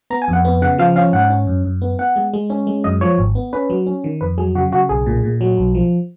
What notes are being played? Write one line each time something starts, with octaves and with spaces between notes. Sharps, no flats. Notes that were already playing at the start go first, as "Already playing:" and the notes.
B3 A#5
G#5
F2 F#5
B3
C#3 F#5
F3 F5
C#4 F5
G#2 F#5
C#4
F#2
F#2
B3
B3 F#5
G#3
G#3
C#4
G#3
F#2 D#5
F3 C#5
G#1
B3
C#4 B4
F#3
C#4
D#3
F2 B4
F#3 G#4
C#3 F#4
C#3 F#4
B1 G#4
A#2
A#2
F#3
B1
F3